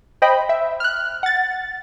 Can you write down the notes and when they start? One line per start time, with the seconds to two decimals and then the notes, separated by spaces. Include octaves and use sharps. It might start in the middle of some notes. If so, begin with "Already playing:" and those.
0.22 C5 D#5 G5 B5
0.49 E5
0.80 F6 F#6
1.23 F#5 A6